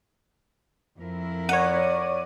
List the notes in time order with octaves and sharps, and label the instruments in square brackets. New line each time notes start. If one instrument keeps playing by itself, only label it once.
[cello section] F2 E4 A#4
[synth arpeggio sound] C#5 D#7 [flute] D5 [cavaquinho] F#5